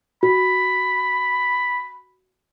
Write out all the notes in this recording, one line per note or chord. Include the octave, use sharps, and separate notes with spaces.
F#4 B5